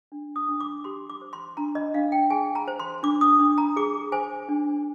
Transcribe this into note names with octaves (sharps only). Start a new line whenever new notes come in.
D4
D#6
D4
D6
G4 C6
D6
C5
C6
D4 A#5
D#5
D4 F5
G5
G#4 G#5
A#5
C5
C6
D4 D6
D#6
D4
A#5
G#4 D6
C5 G#5
D4